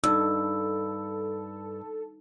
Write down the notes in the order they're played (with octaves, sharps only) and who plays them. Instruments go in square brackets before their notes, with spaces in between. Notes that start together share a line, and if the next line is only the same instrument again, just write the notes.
[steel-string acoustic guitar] G2 [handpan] D#4 [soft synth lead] A4 [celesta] E6